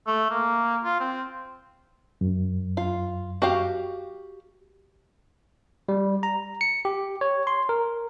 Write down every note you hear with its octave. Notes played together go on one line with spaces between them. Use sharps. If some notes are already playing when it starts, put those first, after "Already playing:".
A3
A#3
F4
C4
F#2
F4
F#4 G4 F5
G3
A#5
C#7
G4
C#5
C6
A#4